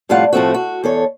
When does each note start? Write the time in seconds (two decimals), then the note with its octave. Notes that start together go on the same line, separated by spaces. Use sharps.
0.09 F2 A2 G3 F4 F5 F#5
0.33 A2 F3 A3 C4 F#4
0.54 F#4
0.84 E2 A4 C#5